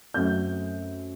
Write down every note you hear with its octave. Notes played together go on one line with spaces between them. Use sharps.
F#2 F#3 A3 C4 G6